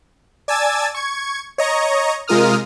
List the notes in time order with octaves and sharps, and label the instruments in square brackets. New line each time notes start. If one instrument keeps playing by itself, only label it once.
[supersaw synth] D5 G#5 A5 E6 G#6 A6
C#6 G#6
C#5 D#5 A#5 C#6
C3 G#3 F4 A#4 D#6 F6